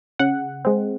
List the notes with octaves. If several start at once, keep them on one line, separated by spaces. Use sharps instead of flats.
C#3 F#5
G#3 C4